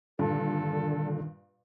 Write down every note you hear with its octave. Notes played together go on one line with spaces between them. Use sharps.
G2 A#2 D3 D#3 A4